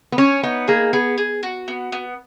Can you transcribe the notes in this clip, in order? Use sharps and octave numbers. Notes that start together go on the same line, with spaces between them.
B3
C#4 C#5
B3 D#4
A#3 G#4
B3 G#4
G#4
F#4
B3
B3